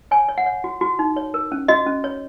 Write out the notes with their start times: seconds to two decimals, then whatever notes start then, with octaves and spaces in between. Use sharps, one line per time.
0.11 C#5 G#5
0.28 C#5
0.38 F#5
0.46 C#5
0.64 F#4
0.81 F#4
0.99 D#4
1.16 C#5
1.34 A#4
1.52 C#4
1.68 F#4 D#5
1.86 C#4
2.04 C#5